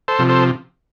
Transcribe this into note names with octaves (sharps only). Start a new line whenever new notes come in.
A4 C5
C3 F3
A4 C5